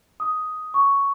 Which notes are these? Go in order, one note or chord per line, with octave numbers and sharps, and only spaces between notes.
D#6
C#6